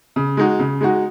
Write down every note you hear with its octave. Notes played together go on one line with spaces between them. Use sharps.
C#3
G#3 D#4 F#4
C#3
G#3 D#4 F#4